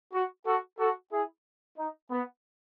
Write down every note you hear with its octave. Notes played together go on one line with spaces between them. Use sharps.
F#4
F#4 A4
F#4 A4
E4 G#4
D#4
B3